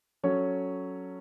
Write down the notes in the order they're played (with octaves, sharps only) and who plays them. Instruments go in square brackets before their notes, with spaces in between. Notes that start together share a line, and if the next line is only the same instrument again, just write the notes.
[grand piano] F#3 C#4 A4 C#5